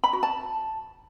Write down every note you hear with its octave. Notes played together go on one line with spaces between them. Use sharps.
B5
F#4
A5